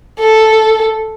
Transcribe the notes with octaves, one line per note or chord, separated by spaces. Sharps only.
A4